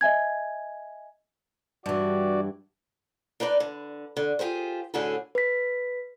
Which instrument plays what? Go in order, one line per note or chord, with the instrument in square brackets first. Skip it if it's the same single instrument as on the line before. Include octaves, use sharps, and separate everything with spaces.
[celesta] D#5 E5 G#5 G#6
[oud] G2 E3 [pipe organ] F#4 D5
[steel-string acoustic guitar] D4 D#4 B4 D5
D3
D3
F4 G4 G#4 C5
A2 D3 C#4 F#4 G#4 A4
[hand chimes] B4 B6